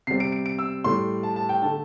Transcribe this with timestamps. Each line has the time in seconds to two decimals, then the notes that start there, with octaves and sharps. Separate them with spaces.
0.07 C3 G3 C7
0.20 D7
0.32 D7
0.46 D7
0.59 E6
0.84 A2 G3 C6
1.23 A5
1.36 A5
1.49 G5
1.62 D3 A3 A5